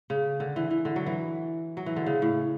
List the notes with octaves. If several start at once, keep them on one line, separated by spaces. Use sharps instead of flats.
C#3
D3
E3
E3
D3
F#3
E3
F#3
E3
D3
C#3
A2